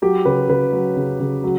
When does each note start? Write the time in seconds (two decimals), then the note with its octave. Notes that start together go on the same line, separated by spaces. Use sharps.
0.02 F#3 G4
0.25 C#3 B4
0.49 C#3 B4
0.73 F#3
0.97 C#3
1.20 C#3
1.44 F#3